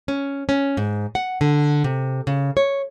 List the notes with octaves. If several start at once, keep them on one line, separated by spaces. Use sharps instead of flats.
C#4
C#4
G#2
F#5
D3
C3
C#3
C#5